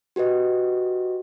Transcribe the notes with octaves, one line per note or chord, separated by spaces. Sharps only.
F#4 G4 B4 D#5